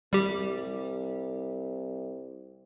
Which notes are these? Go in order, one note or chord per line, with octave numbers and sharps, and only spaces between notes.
C2 G3 G4